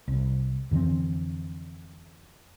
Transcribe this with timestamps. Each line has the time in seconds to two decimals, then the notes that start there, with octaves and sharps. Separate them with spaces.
0.08 C2
0.71 F2 D3 E3 C4